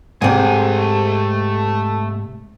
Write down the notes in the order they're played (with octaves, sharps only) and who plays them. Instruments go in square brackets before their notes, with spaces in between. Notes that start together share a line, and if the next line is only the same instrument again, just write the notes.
[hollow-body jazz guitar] G#2 C3 [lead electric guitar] A3 G#5